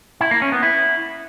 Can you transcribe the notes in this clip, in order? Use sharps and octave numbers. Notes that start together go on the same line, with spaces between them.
E4
A#3
C#4
B3
E4